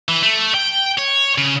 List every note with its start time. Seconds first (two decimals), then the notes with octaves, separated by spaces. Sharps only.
0.09 E3
0.23 A3
0.55 G5
0.98 C#5
1.38 C#3